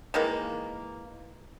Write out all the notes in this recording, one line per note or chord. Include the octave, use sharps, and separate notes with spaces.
D#3 E3 G#3 A#3